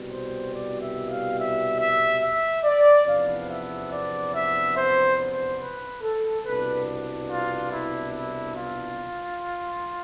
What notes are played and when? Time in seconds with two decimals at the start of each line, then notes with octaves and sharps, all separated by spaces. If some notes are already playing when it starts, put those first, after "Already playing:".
Already playing: C2 B2 G3
0.10 C5
0.52 D5
0.79 E5
1.08 F5
1.36 E5
1.78 E5
2.20 E5
2.64 D5
3.05 E2 C3 F3 B3 D4 F5
3.48 E5
3.90 D5
4.32 E5
4.74 C5
5.17 C5
5.60 B4
6.02 A4
6.44 C2 B2 B3 D4 B4
7.29 F4
7.71 E4
8.12 E4
8.55 F4